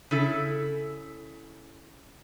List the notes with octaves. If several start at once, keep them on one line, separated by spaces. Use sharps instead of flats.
C#3 E4 A4